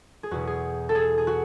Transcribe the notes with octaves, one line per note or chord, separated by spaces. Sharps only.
G#4
E2 B2 F#4
G#4
A4
G#4
G#4
F#4